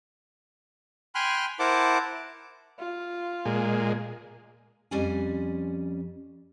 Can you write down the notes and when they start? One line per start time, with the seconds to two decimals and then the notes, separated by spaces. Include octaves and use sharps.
1.15 G5 G#5 B5 C6 F6 F#6
1.59 E4 A#4 C5 F#5 A5 D6
2.79 F4
3.45 A#2 G#3
4.91 F2 G3 C#4 C5 G#5